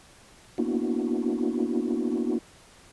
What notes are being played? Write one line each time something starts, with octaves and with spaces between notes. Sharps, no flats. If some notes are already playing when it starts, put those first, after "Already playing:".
A#3 B3 D4 E4 F#4